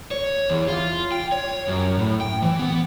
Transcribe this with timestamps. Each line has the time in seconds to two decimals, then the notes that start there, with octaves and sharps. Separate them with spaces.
0.11 C#5
0.50 E2
0.68 F4
1.12 G5
1.32 C#5
1.68 F#2
1.99 A2
2.21 G5
2.42 E3
2.59 B3